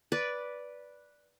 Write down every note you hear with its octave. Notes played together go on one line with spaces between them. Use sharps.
B4 D5